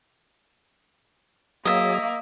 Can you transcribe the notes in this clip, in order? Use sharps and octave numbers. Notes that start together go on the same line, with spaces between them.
F#3 A#3 G#4 D#5 E5